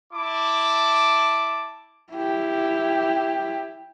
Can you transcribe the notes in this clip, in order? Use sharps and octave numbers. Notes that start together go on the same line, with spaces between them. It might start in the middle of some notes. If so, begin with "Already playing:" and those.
E4 A5 D6
E4 G4